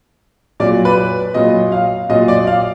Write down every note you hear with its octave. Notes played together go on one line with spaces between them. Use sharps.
A#2 F#3 D5
B4
A#2 F#3 D#5
F5
A#2 F#3 D#5
D5
F5